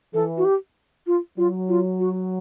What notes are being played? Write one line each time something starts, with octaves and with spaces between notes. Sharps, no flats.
E3 A4
F#4
G4
F4
F#3 F4
F4
F#4